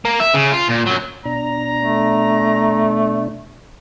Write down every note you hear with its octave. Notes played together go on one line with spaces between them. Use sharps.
A#3
E5
C#3
F4
A#2
F#2 F#3
B2 D4 A#5
A3